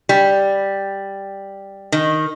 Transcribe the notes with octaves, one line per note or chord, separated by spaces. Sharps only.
G3
D#3